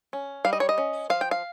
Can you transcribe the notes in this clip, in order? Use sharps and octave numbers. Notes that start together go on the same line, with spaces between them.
C#4
G3 F5
D#5
C#5
D#5
C#4
F3 F5
G5
F5